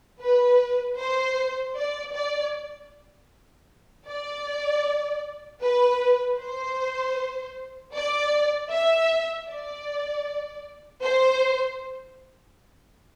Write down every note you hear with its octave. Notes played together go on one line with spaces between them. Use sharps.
B4
C5
D5
D5
D5
B4
C5
D5
E5
D5
C5